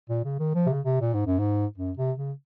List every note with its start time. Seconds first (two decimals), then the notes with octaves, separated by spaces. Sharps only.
0.09 A#2
0.24 C#3
0.39 D#3
0.55 F3
0.66 C3
0.70 C#3
0.85 C3
1.01 A#2
1.14 G#2
1.27 F#2
1.39 G#2
1.78 F#2
1.97 C3
2.18 C#3